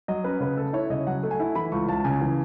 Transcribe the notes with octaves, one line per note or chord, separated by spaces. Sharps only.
F#3 D#5
C#4 B4
C#3 B4
A3 A4
E4 C#5
C#3 D#5
F#3 F#5
A3
G#5
E4
E3 B5
C#2 C#6
C#2 A5
C#3 G#5
E3